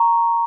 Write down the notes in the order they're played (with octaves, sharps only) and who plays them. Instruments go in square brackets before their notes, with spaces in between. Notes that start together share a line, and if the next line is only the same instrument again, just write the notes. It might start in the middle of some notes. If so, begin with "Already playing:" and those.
Already playing: [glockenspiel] A#5 C#6